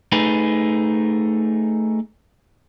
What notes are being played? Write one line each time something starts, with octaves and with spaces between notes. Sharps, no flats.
A3 D#4 G#4 B4